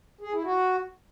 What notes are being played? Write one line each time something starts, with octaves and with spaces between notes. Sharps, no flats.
G#4
E4
F#4